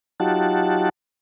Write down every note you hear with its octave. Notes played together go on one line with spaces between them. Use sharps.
F#3 D#4 F4 G4 F#5 A5